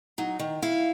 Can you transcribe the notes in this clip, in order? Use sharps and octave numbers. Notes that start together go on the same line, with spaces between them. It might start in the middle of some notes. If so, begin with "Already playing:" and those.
F#3 D#4
D#3
E4 F5